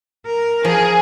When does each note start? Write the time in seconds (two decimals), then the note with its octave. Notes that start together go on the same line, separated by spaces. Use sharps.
0.26 A#4
0.64 F3 G#4